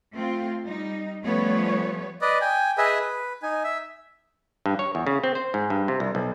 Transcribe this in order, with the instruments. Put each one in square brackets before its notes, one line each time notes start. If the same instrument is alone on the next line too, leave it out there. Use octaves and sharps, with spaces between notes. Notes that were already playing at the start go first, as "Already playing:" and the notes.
[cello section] A3 C4 F4
G3 D#4
F3 G3 A3 B3 C#4 C#5
[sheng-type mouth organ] B4 D5 D#5
G5 G#5
G#4 B4 D#5 E5 G#5
B4
D#4 G#5
E5
[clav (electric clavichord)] G2
C#5
E2
C#3
C4
C5
G#2
G2
C3
C2
B1